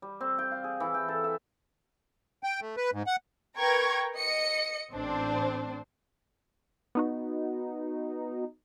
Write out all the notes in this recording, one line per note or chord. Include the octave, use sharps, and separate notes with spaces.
G3
C4
G5
F5
G#4
E3
G5
A4
E5
G5
A3
B4
G#2
F#5
A#4 B4 G5 A#5 C#6 G#6
D#5 C#7
A1 C4 D4 C5
B3 D#4 F#4